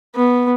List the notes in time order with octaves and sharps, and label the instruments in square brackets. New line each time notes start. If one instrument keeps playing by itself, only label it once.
[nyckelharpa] B3